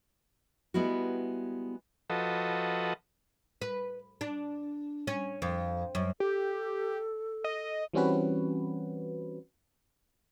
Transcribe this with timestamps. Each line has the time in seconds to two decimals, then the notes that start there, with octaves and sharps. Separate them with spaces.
0.74 G3 G#3 B3 E4 F#4
2.10 F3 F#4 A4 B4 D#5
3.61 B4
4.21 D4
5.07 C#4
5.42 F2
5.95 F#2
6.20 G4 A4
7.44 D#5
7.93 E3 G3 C4 C#4 F#4 B4